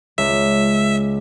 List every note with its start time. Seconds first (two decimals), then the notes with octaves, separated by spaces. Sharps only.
0.18 C#2 E5